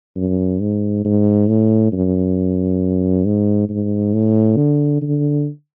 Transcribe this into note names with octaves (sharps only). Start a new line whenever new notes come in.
F#2
G#2
G#2
A2
F#2
G#2
G#2
A2
D3
D3